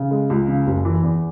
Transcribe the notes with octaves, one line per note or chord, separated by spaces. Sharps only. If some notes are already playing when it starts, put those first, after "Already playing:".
Already playing: C#3
G#3
C#2
C#3
F#1
E3
E2